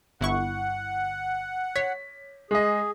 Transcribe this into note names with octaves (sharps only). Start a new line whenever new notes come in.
G1 E4 F#5 C#6
C#5 B6
G#3 G#4 D#5